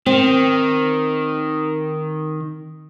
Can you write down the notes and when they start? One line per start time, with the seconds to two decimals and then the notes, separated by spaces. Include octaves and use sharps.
0.06 D#3 C4